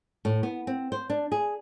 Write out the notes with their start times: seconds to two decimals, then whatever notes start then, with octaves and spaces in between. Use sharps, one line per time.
0.25 A2
0.43 B3
0.67 C4
0.92 C5
1.10 D4
1.32 G#4